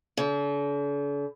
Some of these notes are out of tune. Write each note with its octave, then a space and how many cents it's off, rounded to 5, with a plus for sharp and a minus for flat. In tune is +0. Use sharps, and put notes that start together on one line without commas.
D3 -45